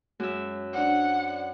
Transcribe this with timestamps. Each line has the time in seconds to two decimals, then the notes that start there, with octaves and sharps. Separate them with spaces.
0.20 F#2 G#3 E5
0.73 D4 C5 D5 F#5